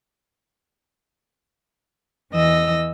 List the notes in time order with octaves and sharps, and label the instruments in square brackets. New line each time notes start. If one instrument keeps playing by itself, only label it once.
[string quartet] E2 E3 D#5 E6 A#6